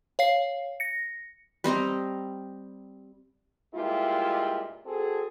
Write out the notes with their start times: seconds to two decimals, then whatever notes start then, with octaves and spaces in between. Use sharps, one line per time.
0.19 C#5 F5 C7
0.80 A#6 C#7
1.64 G3 C4 D#5 A#5
3.74 G2 A#2 G#3 E4 F4 G4
4.86 C4 F#4 G#4 A4